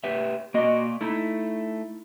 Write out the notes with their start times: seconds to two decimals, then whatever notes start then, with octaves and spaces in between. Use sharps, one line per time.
0.04 G4 B4 E5
0.54 A#3 F#4 D5 D#5
1.01 A3 D#4 E4